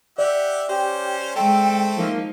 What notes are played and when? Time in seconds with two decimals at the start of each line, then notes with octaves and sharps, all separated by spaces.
0.18 G4 D5 E5 F#5
0.69 C#4 G4 C5
1.36 G#3 A3 C4 A4 G5
1.97 F3 A#3 D#4